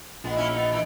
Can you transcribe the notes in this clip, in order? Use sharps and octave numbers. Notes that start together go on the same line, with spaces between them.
A#1 G#3 B3
A#3 C#4 E4
B3 D#4
D#2 E3 D#4